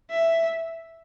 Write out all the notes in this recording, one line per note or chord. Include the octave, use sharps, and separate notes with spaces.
E5